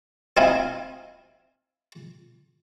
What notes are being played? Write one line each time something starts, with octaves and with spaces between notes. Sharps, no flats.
C4 D#4 E4 F5 G#5